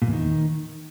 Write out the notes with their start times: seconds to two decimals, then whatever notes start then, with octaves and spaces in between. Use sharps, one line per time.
0.02 A#2
0.07 E2
0.13 D#3